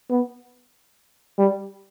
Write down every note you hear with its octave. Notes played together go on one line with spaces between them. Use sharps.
B3
G3